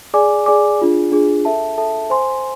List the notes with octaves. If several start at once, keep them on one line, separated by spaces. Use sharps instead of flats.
G#4 D5 G#5 D6
G#4 D5 G#5 D6
D4 F4 G#4
D4 F4 G#4
A4 E5 A5
A4 E5 A5
C5 G#5 C6